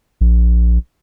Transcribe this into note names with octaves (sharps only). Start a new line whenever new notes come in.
A#1